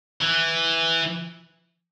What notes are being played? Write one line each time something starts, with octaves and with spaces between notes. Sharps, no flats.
E3